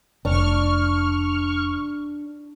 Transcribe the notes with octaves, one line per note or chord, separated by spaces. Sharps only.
F1 D4 C#6 F6